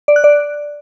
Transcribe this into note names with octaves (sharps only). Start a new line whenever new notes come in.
D5
F#6
D5